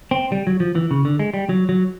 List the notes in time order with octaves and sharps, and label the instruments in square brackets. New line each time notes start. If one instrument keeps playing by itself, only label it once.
[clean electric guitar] C4
G3
F#3
F3
E3
C#3
D3
G#3
G3
F#3
F#3